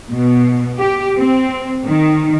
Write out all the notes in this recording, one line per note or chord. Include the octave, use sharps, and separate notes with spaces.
B2
G4
C4
D#3